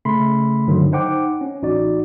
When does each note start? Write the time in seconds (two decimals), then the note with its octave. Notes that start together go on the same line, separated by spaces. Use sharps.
0.05 C#3 A3 B5 C6
0.67 G2 D3 D#3 F#3
0.92 D#4 C5 F#5 G5 D6
1.41 C#4
1.62 A1 D#4 F#4 D5